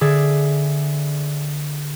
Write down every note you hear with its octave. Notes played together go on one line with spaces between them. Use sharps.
D3 G#4 D5 E5